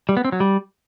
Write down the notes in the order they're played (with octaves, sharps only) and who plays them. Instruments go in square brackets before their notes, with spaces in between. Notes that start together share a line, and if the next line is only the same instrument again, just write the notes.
[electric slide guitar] G3
B3
C4
F#3
G3